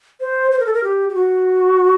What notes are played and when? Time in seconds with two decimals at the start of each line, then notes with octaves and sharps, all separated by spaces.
0.20 C5
0.51 C5
0.60 A#4
0.66 A4
0.74 A#4
0.84 G4
1.09 G4
1.15 F#4